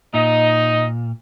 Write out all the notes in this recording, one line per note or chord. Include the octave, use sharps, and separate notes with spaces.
A#2 D#4 D#5